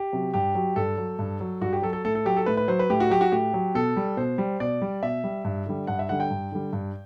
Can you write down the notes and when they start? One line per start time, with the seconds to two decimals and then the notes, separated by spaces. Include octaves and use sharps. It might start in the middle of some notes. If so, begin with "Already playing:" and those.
Already playing: G4
0.13 C3 F#3
0.34 G2 G4
0.55 F#3
0.76 G2 A4
0.98 F#3
1.19 G2
1.40 F#3
1.61 G2 F#4
1.73 G4
1.82 F#3 A4
1.93 A4
2.05 A2 A4
2.15 A4
2.25 F#3 G4
2.37 A4
2.46 A2 B4
2.57 B4
2.68 F#3 C5
2.79 B4
2.90 A2 G4
3.00 F#4
3.10 F#3 G4
3.21 F#4
3.32 A2 G4
3.54 F#3
3.75 B2 A4
3.97 G3
4.17 B2 C5
4.38 G3
4.60 B2 D5
4.82 G3
5.02 B2 E5
5.24 G3
5.45 G2
5.66 D3 G3
5.87 G2 F#5
5.99 E5
6.09 D3 G3 F#5
6.20 G5
6.30 G2
6.52 D3 G3
6.73 G2